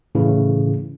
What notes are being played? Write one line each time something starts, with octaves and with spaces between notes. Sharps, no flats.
A2 C#3 E3